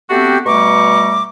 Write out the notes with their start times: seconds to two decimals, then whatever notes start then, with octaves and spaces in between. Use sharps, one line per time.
0.09 A3 B3 C4 D4 F#4 G4
0.46 B2 G3 A3 A#5 C#6 D6